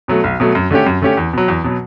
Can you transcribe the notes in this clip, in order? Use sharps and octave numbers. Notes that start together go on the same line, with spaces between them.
B2 F#3 A3
B1
B2 F#3 A3
F#2
D3 A3 C#4 G4
F#2
D3 A3 C#4 G4
E2
B2 F#3
E2
B2 F#3